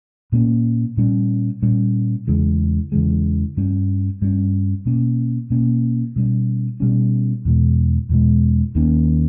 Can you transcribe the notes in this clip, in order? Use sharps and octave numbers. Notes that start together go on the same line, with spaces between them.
A#2 A#3 C#4
A#2 G3 C#4
A#2 G3 C#4
E2 C#3 E3 G#3
E2 C#3 E3 G#3
G2 G3 C#4
G2 G3 C#4
B2 A#3 C#4
B2 A#3 C#4
B2 G3 C#4
B2 G3 C#4
E2 B2 G#3
E2 B2 G#3
D#2 D#3 A#3 C#4